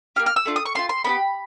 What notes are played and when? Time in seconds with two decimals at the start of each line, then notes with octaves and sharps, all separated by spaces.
0.16 A#3 D#4 G4 F6
0.26 F6
0.36 E6
0.46 A3 D4 F4
0.56 D#6
0.65 C#6
0.75 A3 D4 F4 C6
0.89 C6
1.04 B3 D4 G4 B5